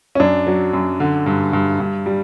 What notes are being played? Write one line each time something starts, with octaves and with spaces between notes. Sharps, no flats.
C#4
F#2 D4
F#3
F#2
D3
G2
G2
G2
G3